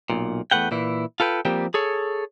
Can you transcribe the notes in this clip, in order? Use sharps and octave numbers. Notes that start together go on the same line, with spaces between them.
B1 A#2
E2 F3 A3 B4 F#5 G5
A#2 E3 E4
F4 A4 B4 G5
F3 G3 A#3 C4 G4
G#4 A4 C#5